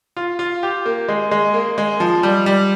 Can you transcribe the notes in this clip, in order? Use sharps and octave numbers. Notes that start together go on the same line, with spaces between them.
F4
F4
G4
A#3
G#3
G#3
A#3
G#3
F3
G3
G3